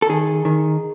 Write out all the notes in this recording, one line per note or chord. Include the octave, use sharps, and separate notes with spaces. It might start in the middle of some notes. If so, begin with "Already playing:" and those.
A4
D#3 G#4
D#3